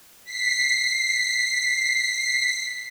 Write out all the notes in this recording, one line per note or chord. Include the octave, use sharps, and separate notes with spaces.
B6 C7